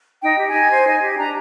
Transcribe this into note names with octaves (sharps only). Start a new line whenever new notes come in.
D#4 G5
G4
G#5
D#4
C5
D#4
G4
D4 A#5